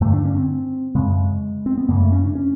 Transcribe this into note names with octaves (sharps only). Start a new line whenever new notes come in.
G2 D3 A3
D4
C#4
C4
F#2 C#3 G#3
C4
B3
F#2 C#3 A#3
A3
C#4
D4
C#4